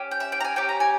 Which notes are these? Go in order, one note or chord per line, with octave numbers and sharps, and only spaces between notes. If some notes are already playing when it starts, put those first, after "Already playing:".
Already playing: C#4 G4
G5
E5
G5
A#5
G#5
C#4 G4 G5
A#5
G#5